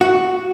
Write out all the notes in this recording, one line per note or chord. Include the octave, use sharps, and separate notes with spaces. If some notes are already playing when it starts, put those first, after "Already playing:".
F#4